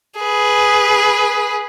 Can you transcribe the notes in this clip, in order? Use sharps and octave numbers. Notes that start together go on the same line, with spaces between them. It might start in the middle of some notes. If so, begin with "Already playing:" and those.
G#4 B4